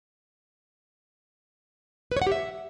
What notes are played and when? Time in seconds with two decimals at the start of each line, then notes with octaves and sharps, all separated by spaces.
2.12 B4
2.17 C#5
2.22 F#5
2.27 G4
2.32 E5